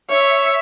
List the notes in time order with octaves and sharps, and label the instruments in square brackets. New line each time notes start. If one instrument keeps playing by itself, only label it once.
[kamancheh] C#5 [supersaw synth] E5